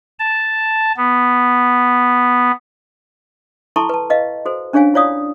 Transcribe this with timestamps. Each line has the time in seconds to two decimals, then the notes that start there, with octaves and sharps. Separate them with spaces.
0.19 A5
0.97 B3
3.76 E4 A4 A5 A#5 C6 C#6
3.89 B4 A5
4.10 B4 D#5 F5
4.46 F#4 A4 C5
4.73 C#4 D4 G#4 C#5 F5 G#5
4.94 E4 F4 C#5 D5 F5 D#6